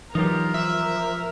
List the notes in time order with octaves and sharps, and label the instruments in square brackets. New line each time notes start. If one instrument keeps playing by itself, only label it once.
[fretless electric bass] E3 F#3 [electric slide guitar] D#4 F4 G4 [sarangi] A#4
[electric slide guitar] F3 [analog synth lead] E5